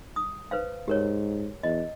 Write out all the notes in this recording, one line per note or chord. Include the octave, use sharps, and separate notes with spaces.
D#6
B4 C5 F5
G#2 G4 A#4 C#5
E2 D#5